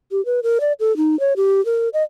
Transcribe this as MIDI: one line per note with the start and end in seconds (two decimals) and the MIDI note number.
0.12 0.24 67
0.26 0.40 71
0.43 0.58 70
0.61 0.73 74
0.80 0.96 69
0.97 1.19 63
1.20 1.33 73
1.37 1.64 67
1.66 1.89 70
1.94 2.03 75